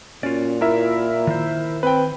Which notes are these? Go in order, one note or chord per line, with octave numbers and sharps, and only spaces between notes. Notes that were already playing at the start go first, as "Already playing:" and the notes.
A#2 C#4 F4 F#4 D5
E4 A#4 E5
D#3 C5
C4 B4 G5